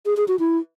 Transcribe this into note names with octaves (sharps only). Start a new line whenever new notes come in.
G#4
G#4
F#4
E4